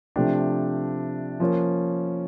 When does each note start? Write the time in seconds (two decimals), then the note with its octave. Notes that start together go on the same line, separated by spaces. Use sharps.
0.16 C3 F3 A3 D4 G4
1.40 F3 A#3 C#4